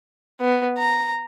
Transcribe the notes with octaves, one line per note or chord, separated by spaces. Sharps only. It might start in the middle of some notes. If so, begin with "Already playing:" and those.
B3
A#5